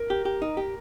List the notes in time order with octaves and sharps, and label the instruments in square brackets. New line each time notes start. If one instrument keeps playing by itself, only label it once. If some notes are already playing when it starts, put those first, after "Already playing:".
Already playing: [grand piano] A#4
[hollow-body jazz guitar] G4
G4
D#4
G4